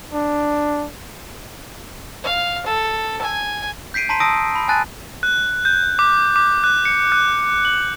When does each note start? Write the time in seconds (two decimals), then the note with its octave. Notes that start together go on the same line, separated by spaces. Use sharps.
0.13 D4
2.24 F5
2.67 A4
3.22 G#5
3.94 G6 B6 C7 D7 D#7
4.09 A5 A#5 C6 B6 D#7
4.20 A5 D#6 E6 A#6 D7
4.55 B5
4.68 G#5 A5 F#6 A6 D#7
5.23 F#6
5.65 G6
5.99 D6
6.36 D6
6.64 F#6
6.85 C#7
7.12 F#6
7.65 F#7